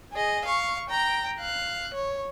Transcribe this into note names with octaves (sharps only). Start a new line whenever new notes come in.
G#4 D#5
F5 C#6
G5 A#5
F5 F#6
C#5